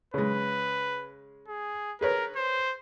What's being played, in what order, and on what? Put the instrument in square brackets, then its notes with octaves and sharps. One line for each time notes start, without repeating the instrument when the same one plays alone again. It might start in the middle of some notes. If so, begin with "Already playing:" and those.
[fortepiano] C#3 G#3 [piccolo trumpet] B4
[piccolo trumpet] G#4
[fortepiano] G#4 B4 C#5 [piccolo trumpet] A#4
[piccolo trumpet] C5